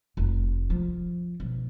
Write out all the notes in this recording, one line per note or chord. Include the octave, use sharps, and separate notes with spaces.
F1
F3
B1